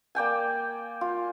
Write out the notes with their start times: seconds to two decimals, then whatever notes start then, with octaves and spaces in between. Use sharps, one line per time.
0.15 A#3 D5 G5 G#5
1.01 F4